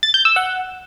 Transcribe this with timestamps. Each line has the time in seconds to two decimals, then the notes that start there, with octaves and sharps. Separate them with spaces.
0.03 A6
0.14 G6
0.25 E6
0.36 F#5